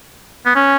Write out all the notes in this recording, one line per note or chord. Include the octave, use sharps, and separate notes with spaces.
B3
C#4